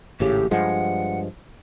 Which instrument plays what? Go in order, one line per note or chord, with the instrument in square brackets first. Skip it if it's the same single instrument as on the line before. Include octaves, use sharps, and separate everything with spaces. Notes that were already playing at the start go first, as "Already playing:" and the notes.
[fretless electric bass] G#1 A2 C#3 [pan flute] G4
[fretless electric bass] G2 F3 G#3 [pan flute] F#5